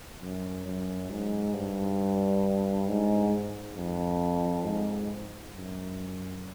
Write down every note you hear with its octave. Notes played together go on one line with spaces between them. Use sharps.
F#2
F#2
G#2
G2
G#2
F2
G#2
F#2